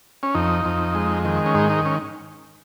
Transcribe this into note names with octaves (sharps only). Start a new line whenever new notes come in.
C#4
F2 D#4
F2
G#3
D#3
C#4
G#2 D#4
D#4
C#4